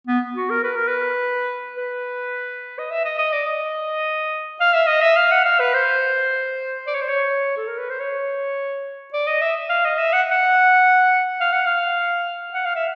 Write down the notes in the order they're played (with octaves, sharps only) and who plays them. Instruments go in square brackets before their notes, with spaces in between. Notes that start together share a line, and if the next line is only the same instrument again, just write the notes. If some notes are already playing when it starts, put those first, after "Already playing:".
[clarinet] B3
F#4
A#4
B4
A#4
B4
B4
D#5
E5
D#5
D#5
D5
D#5
F5
E5
D#5
E5
F5
F#5
F5
B4
C5
D5
C#5
C5
C#5
A4
A#4
B4
C5
C#5
D5
D#5
E5
F5
D#5
E5
F#5
F#5
F5
F#5
F5
F#5
F5
E5